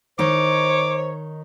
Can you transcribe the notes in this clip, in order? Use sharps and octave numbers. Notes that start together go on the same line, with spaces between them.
D#3 D#4 C5 C#5 D6